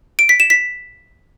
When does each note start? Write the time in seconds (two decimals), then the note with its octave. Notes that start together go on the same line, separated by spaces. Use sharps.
0.19 D7
0.29 B6
0.40 E7
0.50 B6